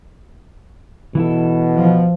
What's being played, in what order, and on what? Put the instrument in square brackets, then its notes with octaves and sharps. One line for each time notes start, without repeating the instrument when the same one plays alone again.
[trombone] B2 [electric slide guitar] E3 E4 A4
[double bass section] F3